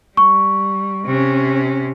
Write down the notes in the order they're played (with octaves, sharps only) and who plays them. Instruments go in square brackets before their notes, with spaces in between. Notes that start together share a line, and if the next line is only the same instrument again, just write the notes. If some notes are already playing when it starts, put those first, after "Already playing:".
[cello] G3 [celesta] C#6
[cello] C3 C#4